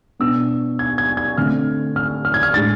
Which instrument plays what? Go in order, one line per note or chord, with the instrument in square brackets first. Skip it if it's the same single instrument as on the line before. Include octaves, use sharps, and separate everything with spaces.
[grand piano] B2 B3 D4 E6
G#6
G#6
G#6
D3 A3 C4 F6
F6
F6
G#6
F6
A2 G#3 D4 A6